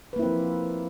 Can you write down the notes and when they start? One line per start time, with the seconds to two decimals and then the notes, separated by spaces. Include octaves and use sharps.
0.13 B4
0.16 A#3
0.19 E4
0.22 C4
0.25 F3